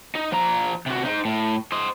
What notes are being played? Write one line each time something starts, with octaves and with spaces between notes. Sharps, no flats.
D#4
F3 A#5
C3 F#4
D#4 C5
A2
C5 D#5